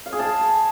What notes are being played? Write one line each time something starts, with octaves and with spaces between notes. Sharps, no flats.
F5
G#4
A5